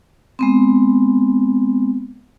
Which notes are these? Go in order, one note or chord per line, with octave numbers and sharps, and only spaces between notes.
G#3 B3 C4